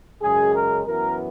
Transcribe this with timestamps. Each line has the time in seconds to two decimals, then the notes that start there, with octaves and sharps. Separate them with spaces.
0.22 F#2 C#3 G#3 G#4
0.54 A#4
0.84 F#2 E3 B3 A#4